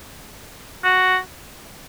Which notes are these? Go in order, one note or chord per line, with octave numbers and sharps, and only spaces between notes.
F#4